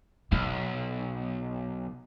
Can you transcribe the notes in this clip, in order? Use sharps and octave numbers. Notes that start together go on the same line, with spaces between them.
B1 D#4